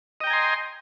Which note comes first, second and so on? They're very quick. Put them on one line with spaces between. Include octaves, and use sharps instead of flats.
D#5 G5 A#5 G#5 C6